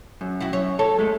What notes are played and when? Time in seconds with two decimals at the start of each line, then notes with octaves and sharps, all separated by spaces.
0.21 F#2
0.41 E4 F#4
0.53 F#2 C#5
0.79 A4 C#5
0.99 G#3 A3